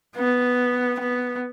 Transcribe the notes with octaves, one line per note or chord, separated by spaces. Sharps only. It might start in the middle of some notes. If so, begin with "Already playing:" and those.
B3
B3